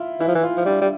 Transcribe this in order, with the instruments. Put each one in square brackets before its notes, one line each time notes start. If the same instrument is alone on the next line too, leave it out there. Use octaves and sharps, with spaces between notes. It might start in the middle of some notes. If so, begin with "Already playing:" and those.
Already playing: [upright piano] E4 F4
[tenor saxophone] E3 [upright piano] E4
[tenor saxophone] F3
E3
[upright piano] F4
[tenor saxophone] F3
[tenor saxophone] G3 [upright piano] D4
[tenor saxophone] G3